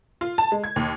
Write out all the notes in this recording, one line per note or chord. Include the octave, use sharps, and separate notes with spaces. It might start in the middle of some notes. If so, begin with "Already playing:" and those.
F4
A5
G#3
G#6
D#2